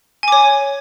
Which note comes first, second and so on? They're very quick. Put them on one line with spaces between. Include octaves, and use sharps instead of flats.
G#5 D6 C#5